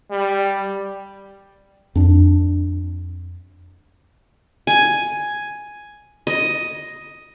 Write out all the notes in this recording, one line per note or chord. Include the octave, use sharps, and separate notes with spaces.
G3
F2 D4
G#5
D#5